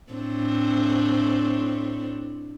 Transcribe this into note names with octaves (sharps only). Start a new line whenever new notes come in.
A2 C4 D4